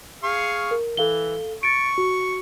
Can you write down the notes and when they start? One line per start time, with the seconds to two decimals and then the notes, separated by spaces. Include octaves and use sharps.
0.23 G#4 F5 C#6
0.71 A#4
0.97 E3 A4 F5 G7
1.63 C#6 A6 C#7 D7
1.98 F#4